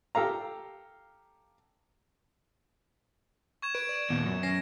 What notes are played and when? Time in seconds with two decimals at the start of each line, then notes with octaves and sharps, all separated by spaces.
0.15 G4 A4 F5 A#5
3.62 C#6 G#6 E7
3.75 B4 D7
3.89 D5
4.10 D#2 A#2 B3
4.26 F#2
4.43 C#4 A#6 C7